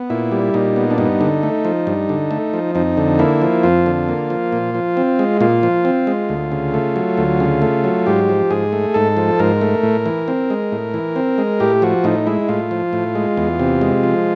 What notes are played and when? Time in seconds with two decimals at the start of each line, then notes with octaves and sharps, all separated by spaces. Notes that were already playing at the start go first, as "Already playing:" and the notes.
Already playing: B3
0.10 A#2 E4
0.31 G3
0.54 A#2 D#4
0.76 B3
0.91 D4
0.98 G2 D#4
1.21 D3
1.43 A3
1.65 F3
1.87 G2
2.09 D3
2.31 A3
2.53 F3
2.75 F2 D#4
2.97 D3
3.19 A#3 E4
3.42 F3
3.63 F2 F4
3.86 D3
4.08 A#3
4.30 F3
4.52 A#2
4.74 F3
4.97 C4
5.19 G#3
5.41 A#2 F4
5.63 F3
5.85 C4
6.07 G#3
6.29 D2
6.52 C#3
6.74 A3
6.96 F#3
7.17 D2
7.40 C#3
7.62 A3
7.84 F#3
8.06 G#2 G4
8.29 F3
8.51 G#2 G#4
8.72 A3
8.94 G#2 A4
9.17 F3
9.40 G#2 A#4
9.61 A3
9.83 A2
10.06 E3
10.28 C4
10.50 G#3
10.72 A2
10.94 E3
11.16 C4
11.38 G#3
11.60 A2 G4
11.82 F3 F#4
12.04 A2 D#4
12.27 G#3 E4
12.49 A2 F4
12.71 F3
12.93 A2
13.15 G#3
13.37 E2
13.60 C3
13.82 G#3
14.03 F3